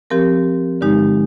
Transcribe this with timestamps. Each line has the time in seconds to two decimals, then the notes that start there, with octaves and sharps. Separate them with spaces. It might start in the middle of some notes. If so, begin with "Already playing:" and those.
0.10 F3 C4 G4 A#4
0.81 G2 D3 G#3 D#4 G4